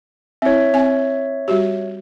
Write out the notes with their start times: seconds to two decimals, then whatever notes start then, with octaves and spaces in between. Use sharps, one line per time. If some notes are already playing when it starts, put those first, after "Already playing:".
0.42 C4 E4 C#5 E5
0.74 C4 G#5
1.48 G3 F#4 G4